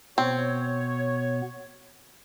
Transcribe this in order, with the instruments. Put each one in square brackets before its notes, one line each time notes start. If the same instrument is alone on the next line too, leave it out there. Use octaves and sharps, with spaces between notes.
[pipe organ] B2 B3 [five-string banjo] C4 [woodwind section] C#5